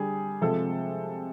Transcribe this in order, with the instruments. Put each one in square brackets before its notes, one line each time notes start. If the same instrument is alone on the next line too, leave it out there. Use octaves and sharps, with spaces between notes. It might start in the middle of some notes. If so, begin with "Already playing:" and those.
Already playing: [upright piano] D3 G3 G#4
C3 F3 G#3 A4